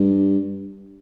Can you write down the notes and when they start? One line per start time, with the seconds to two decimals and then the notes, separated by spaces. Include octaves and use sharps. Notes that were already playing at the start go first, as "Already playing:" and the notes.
Already playing: G2